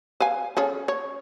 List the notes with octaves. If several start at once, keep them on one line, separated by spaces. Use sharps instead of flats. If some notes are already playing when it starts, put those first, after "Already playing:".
B4 F5 G#5
C#4 G#4 A4
C#5